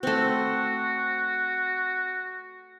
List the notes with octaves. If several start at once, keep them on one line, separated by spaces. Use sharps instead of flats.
A3 C4 F#4